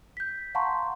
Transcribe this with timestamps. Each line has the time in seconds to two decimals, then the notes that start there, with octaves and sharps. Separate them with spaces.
0.17 G6 B6
0.55 F5 F#5 A5 A#5 C6 C#6